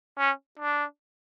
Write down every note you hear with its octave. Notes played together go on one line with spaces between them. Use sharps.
C#4
D4